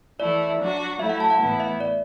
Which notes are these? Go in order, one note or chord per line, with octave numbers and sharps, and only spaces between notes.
E3 A3 E4 D5
F#3 D4 F#4
F#3 A3 E4 E5
F#5
A5
F#5
A2 E3 B3 E4
E5
D5